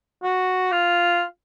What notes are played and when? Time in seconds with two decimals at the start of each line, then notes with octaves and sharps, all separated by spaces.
0.23 F#4
0.72 F4